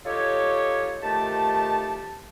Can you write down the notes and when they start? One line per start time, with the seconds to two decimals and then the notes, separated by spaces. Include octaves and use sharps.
0.05 D#4 F4 G4 A4 C#5
1.02 F2 D#3 A3 G4 A5